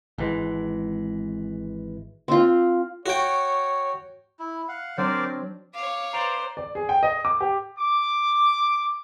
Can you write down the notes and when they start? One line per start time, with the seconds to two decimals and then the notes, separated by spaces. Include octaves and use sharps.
0.18 G#1 E3 G#3
2.28 C4 F4
3.06 F#4 C#5 G5
4.39 E4
4.69 F5 F#5
4.97 F#3 C4 D4 A#4 C5 D5
5.73 C#5 F5 D6
6.13 B4 C5 D5 A#5 D7 F7
6.57 D5
6.75 G#4
6.89 G5
7.03 D#5
7.25 D6
7.41 G4
7.78 D6